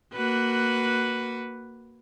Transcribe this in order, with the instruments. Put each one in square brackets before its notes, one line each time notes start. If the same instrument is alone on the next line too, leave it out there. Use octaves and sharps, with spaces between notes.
[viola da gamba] A#3 F#4 B4